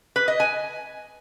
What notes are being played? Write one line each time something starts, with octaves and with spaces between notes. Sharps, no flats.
B4
D#5
G#5